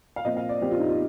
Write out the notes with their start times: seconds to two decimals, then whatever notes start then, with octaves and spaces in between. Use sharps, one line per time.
0.16 F5
0.24 A#2 F3 C4 D#5
0.37 F5
0.49 D5
0.61 A#2 F3 C4 G4
0.71 F4
0.80 D#4
0.89 F4